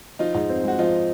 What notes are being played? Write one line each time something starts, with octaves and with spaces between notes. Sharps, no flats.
F3 D#4 F4
G#2
C4
G#3 F#4
F3 D#4 F4